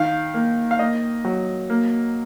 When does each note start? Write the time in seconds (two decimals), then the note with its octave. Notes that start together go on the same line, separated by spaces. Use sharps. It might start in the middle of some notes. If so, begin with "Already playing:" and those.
Already playing: D#3 F5
0.34 A#3
0.71 F5
0.79 A#3 D#5
1.25 F#3
1.70 A#3